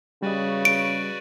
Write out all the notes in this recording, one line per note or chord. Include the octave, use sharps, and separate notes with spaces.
C#3 G3 F#4 B4 D5 D#5
D7